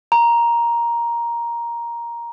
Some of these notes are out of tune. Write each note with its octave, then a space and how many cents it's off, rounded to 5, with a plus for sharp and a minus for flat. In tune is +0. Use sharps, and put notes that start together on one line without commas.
A#5 +10